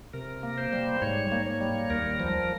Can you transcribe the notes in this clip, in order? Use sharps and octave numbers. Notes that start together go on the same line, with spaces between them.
C3 A#4
A#3
C5
G3
G#2 C#5
A#3
C#5
G3
D#2 A#4
F3